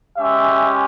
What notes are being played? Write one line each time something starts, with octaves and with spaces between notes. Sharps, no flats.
G#3 C#4 G4 E5